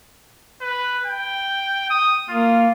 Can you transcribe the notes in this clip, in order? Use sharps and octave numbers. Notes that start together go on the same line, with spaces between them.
B4
G5
D#6
A#3 F4